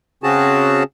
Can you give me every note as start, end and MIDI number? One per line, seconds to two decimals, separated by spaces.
0.23 0.83 49
0.23 0.83 60
0.23 0.83 61
0.23 0.83 66
0.23 0.83 68
0.23 0.83 81